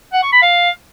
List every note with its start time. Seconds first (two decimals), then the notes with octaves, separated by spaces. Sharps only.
0.13 F#5
0.23 C#6
0.32 B5
0.42 F5